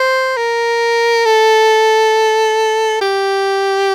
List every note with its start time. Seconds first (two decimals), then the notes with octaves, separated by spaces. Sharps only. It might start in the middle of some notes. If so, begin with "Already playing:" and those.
Already playing: C5
0.37 A#4
1.26 A4
3.02 G4